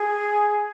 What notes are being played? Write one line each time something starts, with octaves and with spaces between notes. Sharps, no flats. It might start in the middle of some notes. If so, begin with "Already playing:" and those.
Already playing: G#4